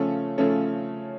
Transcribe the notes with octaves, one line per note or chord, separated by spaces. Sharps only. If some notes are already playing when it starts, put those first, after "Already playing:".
Already playing: C#3 F3 A3 C#4 A4
C#3 F3 A3 C#4 A4